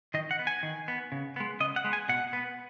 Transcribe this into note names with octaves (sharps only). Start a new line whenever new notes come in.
D#3 D#5
F#5
B3
G#5
D#3
B3
C#3
G#3 B3
C#3 D#5
F#5
G#3 B3
G#5
B2 F#5
B3